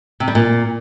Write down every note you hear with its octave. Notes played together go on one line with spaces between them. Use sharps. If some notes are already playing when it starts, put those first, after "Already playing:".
C3
G3
A#2